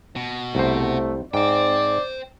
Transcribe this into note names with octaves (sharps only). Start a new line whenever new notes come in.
B2
C2 A3 C5
G#2 C5 D5 G5